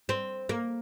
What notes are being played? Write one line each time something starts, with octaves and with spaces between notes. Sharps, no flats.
C4
A#3